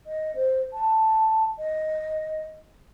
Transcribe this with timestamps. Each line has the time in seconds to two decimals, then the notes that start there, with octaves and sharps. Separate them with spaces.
0.07 D#5
0.35 C5
0.73 A5
1.58 D#5